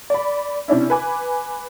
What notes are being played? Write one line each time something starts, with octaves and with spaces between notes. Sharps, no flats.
D5 B5
C3 C#4 D4 E4
B4 G#5 D6